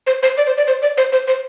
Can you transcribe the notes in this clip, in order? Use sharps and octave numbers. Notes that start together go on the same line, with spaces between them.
C5
C5
D5
C5
D5
C5
D5
C5
C5
C5